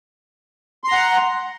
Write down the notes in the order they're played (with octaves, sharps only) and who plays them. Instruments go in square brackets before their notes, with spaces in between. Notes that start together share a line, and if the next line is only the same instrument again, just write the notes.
[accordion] C6
A#5
F#5